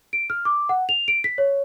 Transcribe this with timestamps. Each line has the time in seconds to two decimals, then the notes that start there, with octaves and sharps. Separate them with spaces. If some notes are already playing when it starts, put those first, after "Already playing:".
0.13 D7
0.30 F6
0.45 D6
0.69 F#5
0.89 F7
1.08 D7
1.24 B6
1.38 C#5